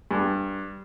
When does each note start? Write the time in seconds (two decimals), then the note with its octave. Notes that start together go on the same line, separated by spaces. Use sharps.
0.11 G2